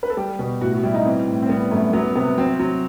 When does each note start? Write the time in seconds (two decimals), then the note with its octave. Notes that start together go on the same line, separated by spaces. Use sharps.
0.03 B4
0.10 A4
0.17 G3 G4
0.39 B2
0.61 A2 F#4
0.72 F#4
0.83 G3 E4
0.94 D#4
1.05 E3 C4
1.28 A2
1.42 C4
1.49 G3 B3
1.71 F#2 A3
1.93 F#3 B3
2.15 C3 B3
2.37 F#3 C4
2.59 F#3